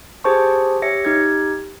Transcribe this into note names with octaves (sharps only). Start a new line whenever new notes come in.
G4 G#4 C5 A5 C#6
G4 C#5 E5 A#6 C#7
D#4 G4 G#6